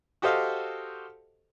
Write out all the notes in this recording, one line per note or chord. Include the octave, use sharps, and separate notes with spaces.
F#4 G4 A4 C5 D#5 F5